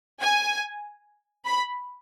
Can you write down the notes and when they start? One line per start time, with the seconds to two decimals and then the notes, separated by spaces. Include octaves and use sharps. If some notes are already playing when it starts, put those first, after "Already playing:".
0.20 G#5
1.46 B5